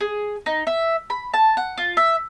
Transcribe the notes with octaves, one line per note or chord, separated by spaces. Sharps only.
G#4
D#4
E5
B5
A5
F#5
F4
E5